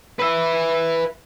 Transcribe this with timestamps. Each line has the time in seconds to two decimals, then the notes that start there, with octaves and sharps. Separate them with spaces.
0.19 B4 E5